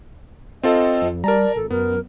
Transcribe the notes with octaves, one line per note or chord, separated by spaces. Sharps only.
C4 F4 A4 D#5
F2
G3 A#4 D5 A5 A#5
G#1 A4
F#2 B3 A#4